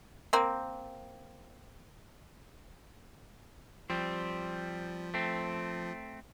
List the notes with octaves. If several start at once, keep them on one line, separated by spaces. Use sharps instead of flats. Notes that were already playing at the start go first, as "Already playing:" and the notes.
A#3 C4
F3 G3 C4
A3 C4